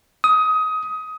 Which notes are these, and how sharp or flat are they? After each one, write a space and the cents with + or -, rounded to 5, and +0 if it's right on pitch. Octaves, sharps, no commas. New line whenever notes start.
D#6 +20